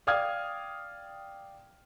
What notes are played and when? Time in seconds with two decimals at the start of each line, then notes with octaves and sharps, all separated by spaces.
0.07 D5 F5 G5 D#6 F6 G#6